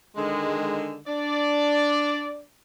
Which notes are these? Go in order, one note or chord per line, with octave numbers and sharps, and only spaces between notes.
D3 D#3 G#3
D4 D5